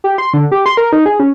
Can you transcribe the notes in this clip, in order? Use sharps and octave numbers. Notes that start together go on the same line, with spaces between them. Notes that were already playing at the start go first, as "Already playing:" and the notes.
G4
C6
D3
G4
C6
A#4
D#4
G#4
C#4